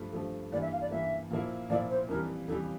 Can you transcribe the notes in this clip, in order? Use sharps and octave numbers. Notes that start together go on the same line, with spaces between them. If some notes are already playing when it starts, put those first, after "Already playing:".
Already playing: G2 F3 A3
G2 F3 A3
G2 E3 A#3 D5
E5
F5
D5
G2 E3 A#3 E5
A#2 F3 A#3 E4
A#2 F3 A#3 E4 D5
C5
F2 E3 G3 A#4
F2 E3 G3 A4